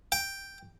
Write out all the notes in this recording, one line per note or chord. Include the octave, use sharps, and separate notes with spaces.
G5